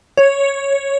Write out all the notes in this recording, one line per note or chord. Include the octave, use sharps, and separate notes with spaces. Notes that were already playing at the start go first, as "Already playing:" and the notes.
C#5